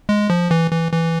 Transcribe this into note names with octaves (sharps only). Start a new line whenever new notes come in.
G#3
F3
E3
E3
E3